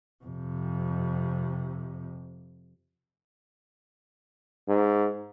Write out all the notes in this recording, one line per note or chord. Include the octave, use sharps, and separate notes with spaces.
F2 C3
G#2